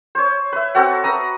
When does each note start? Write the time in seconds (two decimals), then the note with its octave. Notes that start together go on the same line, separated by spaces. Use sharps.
0.15 C5 C#5
0.52 B4 E5
0.75 C4 F#4 A4 F#5
1.04 B4 A#5 D#6